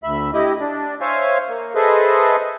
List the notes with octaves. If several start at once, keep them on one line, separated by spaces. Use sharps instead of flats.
D2 E5 B5
E4 G4 D#5
D4
C5 C#5 E5 F5 G#5
A#3
G#4 A4 B4 C5 D#5 E5